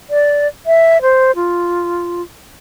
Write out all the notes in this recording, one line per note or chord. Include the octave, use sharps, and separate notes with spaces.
D5
E5
C5
F4